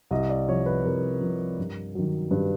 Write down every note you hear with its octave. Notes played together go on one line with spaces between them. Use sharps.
C2 D#5
D5
C3 F3 C#5
B4
C2 A#4
C3 F3
G2
D#3 F#3
G2 B4